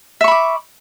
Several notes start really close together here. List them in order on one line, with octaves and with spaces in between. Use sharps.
E5 C#6 B5 D6